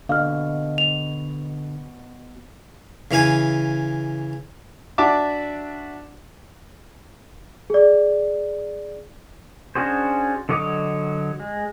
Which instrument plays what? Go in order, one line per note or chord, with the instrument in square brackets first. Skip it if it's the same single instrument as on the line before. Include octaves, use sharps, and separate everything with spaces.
[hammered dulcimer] B2 [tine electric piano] D3 [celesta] F5 F6
[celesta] F7
[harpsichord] C#3 E3 F5 G#5
[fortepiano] D4 F#4 E5 A5 D6
[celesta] G#4 D5
[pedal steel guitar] C#4 D4 F#4 G#4 C5
D3 F#3 C#5 D#5 D6
G#3